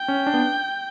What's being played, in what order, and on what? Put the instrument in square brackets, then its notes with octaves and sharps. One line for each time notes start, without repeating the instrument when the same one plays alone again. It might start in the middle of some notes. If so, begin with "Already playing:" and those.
Already playing: [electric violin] G5
[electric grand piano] C#4
D4
B3